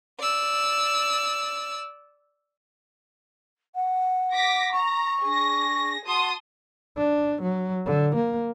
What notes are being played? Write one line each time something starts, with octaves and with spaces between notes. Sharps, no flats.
D5 E6
F#5
D6 A#6 B6
A#5 C#6
D4 G#4 A#6
F#4 A5 C6 D#6
D4
F#3
D3
A#3